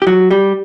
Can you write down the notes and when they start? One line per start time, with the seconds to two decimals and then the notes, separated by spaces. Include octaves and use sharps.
0.02 G4
0.07 F#3 F#4
0.31 G3 G4